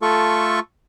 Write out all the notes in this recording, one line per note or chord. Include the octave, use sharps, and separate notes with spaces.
A3 F4 A4 C#6